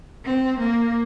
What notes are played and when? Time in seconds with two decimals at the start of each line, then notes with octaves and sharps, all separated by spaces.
0.25 C4
0.59 A#3